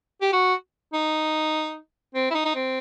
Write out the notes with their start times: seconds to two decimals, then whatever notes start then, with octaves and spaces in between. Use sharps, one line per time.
0.21 G4
0.32 F#4
0.93 D#4
2.15 C4
2.31 E4
2.34 D#4
2.45 D#4
2.55 C4